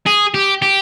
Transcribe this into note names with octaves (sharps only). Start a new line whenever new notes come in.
G#4
G4
G4